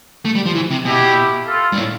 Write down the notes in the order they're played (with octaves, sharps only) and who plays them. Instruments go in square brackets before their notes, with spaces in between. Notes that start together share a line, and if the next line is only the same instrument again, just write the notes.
[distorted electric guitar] A3
G3
F3
E3
C3
[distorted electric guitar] B2 [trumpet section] E4 G4
[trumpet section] F4 A4
[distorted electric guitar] G2
A2